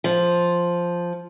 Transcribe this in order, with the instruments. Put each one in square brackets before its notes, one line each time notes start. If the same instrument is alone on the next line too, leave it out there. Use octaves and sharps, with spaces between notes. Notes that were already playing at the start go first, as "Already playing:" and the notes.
[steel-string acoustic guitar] F3